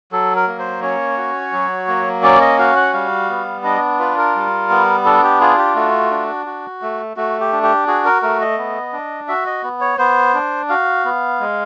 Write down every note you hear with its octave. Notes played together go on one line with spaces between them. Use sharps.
F#3 A4
A#4
A#3
C5
C#4 C#5
F#4
F#3
A#3
C#4 D5
D#5
F#4 F5
F#5
G3 F5
B3
D4 D#5
F4 B4
A#4
G3
B3
D4 A4
G4
F4 G#4
G4
A3 F#4
D4
F#4
A3
A3 F#4
G4
D4
G4
F#4 G#4
A#4
A3 A#4
D#5
B3
D4
F#4 E5
D#5
B3
C#5
B3 C5
D4
F#4 F5
B3
G#3